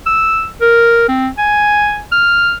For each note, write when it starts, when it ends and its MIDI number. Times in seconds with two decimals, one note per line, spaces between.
0.06 0.47 88
0.61 1.06 70
1.09 1.29 60
1.38 2.01 80
2.12 2.54 89